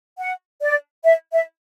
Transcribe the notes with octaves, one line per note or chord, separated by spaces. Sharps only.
F#5
D5
E5
E5